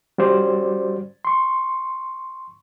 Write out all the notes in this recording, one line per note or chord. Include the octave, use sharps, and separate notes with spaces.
G3 C#4 F#4 C5 D5
C6 C#6